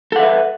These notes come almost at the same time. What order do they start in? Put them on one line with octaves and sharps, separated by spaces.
A4 F#5 E5 B4